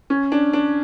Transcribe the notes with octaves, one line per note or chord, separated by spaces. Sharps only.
C#4
D4
D4